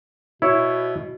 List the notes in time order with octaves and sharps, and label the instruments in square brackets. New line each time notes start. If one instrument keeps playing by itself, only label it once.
[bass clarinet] B2 [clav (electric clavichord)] E4 C#5